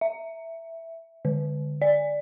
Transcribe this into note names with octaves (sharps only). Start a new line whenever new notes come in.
E5
D3
D5